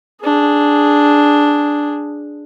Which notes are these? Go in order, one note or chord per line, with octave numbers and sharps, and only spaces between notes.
D4 G#4